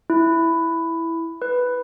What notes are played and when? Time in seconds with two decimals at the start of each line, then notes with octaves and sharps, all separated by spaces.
0.10 E4
1.42 B4